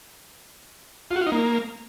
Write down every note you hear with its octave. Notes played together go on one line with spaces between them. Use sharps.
F4
F#4
F4
D#4
A#3